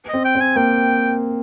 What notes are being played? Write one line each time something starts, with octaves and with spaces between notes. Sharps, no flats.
C4 D#5
G5
C4
G#5
A#3 G5